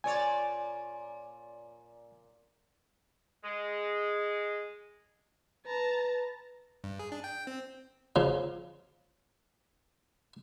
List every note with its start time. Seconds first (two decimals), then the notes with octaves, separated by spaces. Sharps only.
0.04 A#2 C#5 D5 G#5
3.44 G#3
5.66 B4 A5 A#5
6.84 G2
6.99 G#4
7.12 D4
7.24 G5
7.47 C4
8.16 C#3 F3